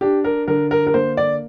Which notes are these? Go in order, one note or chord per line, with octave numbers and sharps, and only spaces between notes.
D4 G4
A#4
D3 A#4
A#4
A#4
A#3 C5
D5